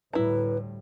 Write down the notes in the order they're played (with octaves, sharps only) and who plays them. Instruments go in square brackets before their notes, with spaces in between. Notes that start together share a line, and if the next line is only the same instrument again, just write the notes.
[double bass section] D2 A2 G3 [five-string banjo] E4 A#5 [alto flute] B4